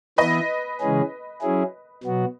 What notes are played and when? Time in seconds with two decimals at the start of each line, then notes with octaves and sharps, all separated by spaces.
0.18 E3 B3 E4 B4 D#5
0.80 C#3 E3 G#3 C#4 G#4
1.41 F#3 C#4 E4 G#4
2.04 B2 F#3 B3 F#4